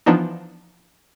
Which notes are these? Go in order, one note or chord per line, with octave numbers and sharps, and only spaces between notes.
E3 F3 B3 D4 D#4